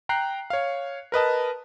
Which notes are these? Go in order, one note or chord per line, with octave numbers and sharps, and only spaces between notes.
G5 A#5 F#6 C7
C#5 F5
A#4 B4 D#5 A5